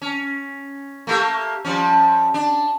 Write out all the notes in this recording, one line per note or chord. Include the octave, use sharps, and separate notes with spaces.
C#4
A3 A#3 G4
F3 G3 C#4
D4